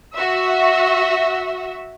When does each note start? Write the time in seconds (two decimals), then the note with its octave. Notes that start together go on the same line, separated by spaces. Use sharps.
0.14 F#4 E5